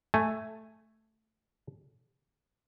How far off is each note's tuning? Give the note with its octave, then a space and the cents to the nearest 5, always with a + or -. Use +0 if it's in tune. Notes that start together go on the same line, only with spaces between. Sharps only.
A3 +0 G#5 +0